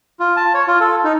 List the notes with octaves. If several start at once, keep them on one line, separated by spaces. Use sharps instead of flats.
F4
A5
C#5
F4
A4
D#4